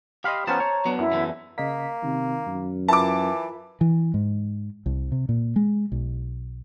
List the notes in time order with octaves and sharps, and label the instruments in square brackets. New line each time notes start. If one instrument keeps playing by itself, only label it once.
[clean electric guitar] G4 B5 C6 [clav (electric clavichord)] D#5 F5
[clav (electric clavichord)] F3 B3 C#4 [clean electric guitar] C5 A5 [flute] A#5
[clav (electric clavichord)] C#5
[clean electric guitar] F#3 B3 D4
[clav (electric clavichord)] F#2 [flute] E4
[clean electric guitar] E2 D3 E3
[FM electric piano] C#3 D#5 B6 [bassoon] A#3
[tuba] C3 [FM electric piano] D#3
[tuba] F#2
[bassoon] E3 [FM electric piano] F4 A#4 B5 [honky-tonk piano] A5 D6
[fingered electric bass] E3
G#2
C2
C3
A#2
G#3
B1